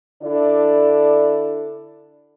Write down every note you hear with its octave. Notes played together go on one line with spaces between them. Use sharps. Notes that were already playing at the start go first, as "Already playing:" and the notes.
D3 D4 E4 A4 D5